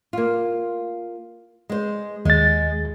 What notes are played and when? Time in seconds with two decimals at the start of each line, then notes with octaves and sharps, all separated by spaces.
0.13 A#3 F4
1.70 G#3 C5
2.25 D#2 G#3 A6